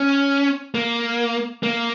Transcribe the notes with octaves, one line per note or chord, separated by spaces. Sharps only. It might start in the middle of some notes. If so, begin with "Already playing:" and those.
Already playing: C#4
A#3
A#3